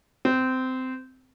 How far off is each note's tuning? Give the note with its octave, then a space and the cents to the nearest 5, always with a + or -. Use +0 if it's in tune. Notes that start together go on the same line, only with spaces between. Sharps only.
C4 -20